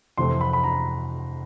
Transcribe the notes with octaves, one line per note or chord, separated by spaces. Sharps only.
F2 C3 E3 A3 C4 C6
B5
B5
A#5